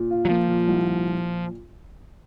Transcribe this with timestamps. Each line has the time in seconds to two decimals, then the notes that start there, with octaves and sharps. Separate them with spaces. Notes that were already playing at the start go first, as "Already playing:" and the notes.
Already playing: A#2
0.11 F4
0.25 F#3
0.29 F3 A#3
0.48 A#2
0.68 C2
0.87 A#2
1.06 A#2